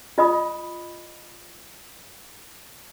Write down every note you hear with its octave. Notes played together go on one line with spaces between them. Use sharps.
F4 D#5 B5 D#6